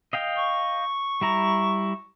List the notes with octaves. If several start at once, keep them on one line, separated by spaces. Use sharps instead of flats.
D#5 F5 G5
C#6
G3 E4 A#5